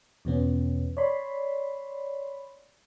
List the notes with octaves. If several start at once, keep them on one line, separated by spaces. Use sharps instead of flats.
E2 B2 B3 C#4
C#5 D5 B5 C6